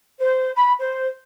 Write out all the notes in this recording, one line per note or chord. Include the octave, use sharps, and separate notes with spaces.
C5
B5
C5